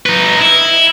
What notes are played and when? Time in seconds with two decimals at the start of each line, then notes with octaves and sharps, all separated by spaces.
0.06 D#4 B4
0.39 E4